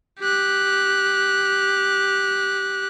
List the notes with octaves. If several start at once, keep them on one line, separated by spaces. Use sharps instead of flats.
G4 F#6